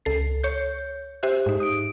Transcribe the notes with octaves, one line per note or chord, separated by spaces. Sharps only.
C#2 A4 C7
C#5 G6
G4 C5 E5 F#6
G#2 D#4
D#6 D7